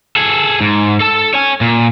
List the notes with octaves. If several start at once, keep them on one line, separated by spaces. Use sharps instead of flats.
G#4 A4
G#2
A4 A5
C#5 G#5
A#2